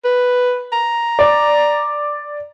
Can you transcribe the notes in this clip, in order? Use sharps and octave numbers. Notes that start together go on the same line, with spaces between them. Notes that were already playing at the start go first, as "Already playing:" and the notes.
B4
A#5
D5